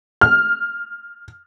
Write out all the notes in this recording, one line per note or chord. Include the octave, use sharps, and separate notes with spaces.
F6